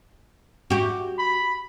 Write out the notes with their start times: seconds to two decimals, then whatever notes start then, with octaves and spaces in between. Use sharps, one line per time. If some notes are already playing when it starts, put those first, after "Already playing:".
0.70 F#4 G4
1.19 B5